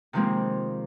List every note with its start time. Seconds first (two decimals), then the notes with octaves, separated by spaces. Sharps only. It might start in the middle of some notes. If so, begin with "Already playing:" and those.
0.13 C3 D#3 F3 G#3 A#3 C4